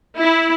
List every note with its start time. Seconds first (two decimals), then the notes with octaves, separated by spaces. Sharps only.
0.18 E4